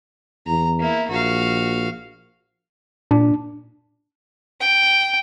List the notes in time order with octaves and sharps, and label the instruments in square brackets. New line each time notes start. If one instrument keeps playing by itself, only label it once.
[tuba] E2 [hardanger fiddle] A#5
[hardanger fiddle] A#3 E4
[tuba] A#1 [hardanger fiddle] F#4 F5
[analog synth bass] A#2 [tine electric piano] D4
[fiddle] G5